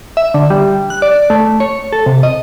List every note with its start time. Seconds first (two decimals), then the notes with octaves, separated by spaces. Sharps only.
0.17 E5
0.34 D3
0.50 G3
0.90 F#6
1.02 D5
1.30 A3
1.60 C#5
1.93 A4
2.06 C3
2.23 D#5